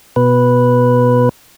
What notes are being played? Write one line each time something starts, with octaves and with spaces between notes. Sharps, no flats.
B2 B4